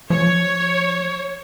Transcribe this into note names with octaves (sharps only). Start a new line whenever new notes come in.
F3 C#5